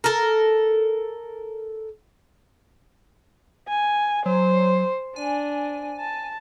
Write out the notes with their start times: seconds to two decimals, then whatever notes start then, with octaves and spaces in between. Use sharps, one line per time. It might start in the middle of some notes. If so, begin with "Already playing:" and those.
0.04 A4 A#4
3.68 G#5
4.26 F#3 C5
5.16 D4 G#5
5.99 A5